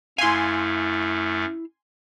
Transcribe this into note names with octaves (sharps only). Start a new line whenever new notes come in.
F#2 A3 E4 F5 G#5 C6